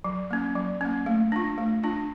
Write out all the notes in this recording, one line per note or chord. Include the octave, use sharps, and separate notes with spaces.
F#3
A#3 C#4
F#3
A#3 C#4
A3
D4 F4
A3
D4 F4